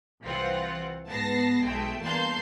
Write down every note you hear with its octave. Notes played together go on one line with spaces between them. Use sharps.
C2 E3 C4 F4 F#5
G#2 B3 A5 A#6 C7
B1 G#3 A3 G5
E2 G2 A#3 A5 C6 G6